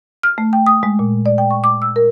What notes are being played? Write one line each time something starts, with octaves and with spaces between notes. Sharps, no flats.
F6
A3
G5
D#6
G#3
A#2
D5
G5
C#6
D6
E6
A#4